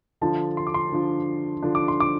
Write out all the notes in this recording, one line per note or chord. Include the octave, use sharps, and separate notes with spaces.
D3 F3 D4 A5
C6
D6
C6
D3 F3 D4
D3 F3 D4
D6
C6
D6